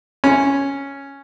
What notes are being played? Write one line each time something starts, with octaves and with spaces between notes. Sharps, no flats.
C#4